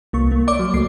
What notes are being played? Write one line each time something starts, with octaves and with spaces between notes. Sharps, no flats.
C2 A#3 C#6
A#3
C#5 D5 D6
F#3
C#2 A3 A#3 D6 C7